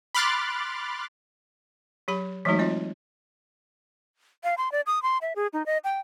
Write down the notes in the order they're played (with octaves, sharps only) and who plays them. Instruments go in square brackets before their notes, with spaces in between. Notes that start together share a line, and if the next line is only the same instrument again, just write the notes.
[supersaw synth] B5 C6 D6 F6 F#6 A6
[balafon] F#3 G4 B5
E3 F#3 G#3 A3 D#4 F#4
C4 F4 D#5
[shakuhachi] F5
C6
D5
D#6
C6
E5
G#4
D#4
D#5
G5